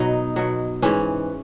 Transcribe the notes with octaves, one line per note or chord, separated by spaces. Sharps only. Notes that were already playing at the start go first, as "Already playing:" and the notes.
Already playing: B2 F#3 D#4
B2 F#3
G#2 E3 C#4